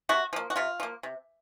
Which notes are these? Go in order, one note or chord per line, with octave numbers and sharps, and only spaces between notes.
C3 F#4
F3 A#3
F#4
C3 F4
F3 A#3
C3